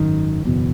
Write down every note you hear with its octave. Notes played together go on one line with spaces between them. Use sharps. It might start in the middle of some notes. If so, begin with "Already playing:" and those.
Already playing: G#1 F#2 D#3
F#1 E2 B2